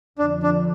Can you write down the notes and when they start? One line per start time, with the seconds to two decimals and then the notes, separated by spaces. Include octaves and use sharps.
0.18 F2 D3 F3 D4
0.43 D4